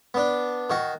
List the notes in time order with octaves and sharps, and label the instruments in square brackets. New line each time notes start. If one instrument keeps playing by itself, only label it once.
[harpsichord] B3 D4
D#3 F#4